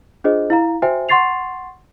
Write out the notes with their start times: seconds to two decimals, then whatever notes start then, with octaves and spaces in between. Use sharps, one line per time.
0.24 D4 F4 G#4 C5 D#5
0.50 E4 F5 A#5
0.82 F#4 C5 E5 G5 G#5
1.09 F#5 C6 C#6 A6 C7 F7